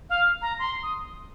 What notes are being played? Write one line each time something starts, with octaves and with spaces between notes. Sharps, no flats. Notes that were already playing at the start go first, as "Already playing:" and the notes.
F5
A#5
C6
D#6